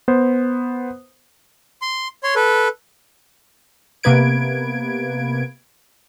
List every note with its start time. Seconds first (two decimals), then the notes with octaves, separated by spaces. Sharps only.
0.08 B3 C5
1.82 C6
2.23 C#5 C6
2.36 A4 B4
4.03 C3 A#3 B3 B4 G#6 D7